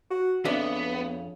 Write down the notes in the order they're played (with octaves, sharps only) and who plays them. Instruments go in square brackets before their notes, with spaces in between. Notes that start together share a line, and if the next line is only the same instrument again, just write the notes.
[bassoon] F#4
[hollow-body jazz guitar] F2 D4 E5 [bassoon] C#3 [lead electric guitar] B3